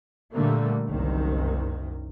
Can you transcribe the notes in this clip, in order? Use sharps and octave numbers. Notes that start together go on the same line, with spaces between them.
A#2 D3 G3 A3 A#3
F#1 C2 D#3